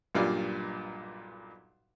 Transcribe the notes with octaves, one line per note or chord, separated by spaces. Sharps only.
B1 G2 A#2 G3 D5 F5